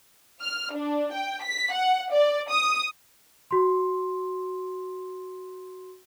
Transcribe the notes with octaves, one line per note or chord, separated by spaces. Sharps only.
F6
D4
G5
B6
F#5
D5
D#6
F#4 C6